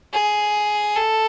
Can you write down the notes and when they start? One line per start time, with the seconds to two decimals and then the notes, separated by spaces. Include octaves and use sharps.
0.13 G#4
0.96 A4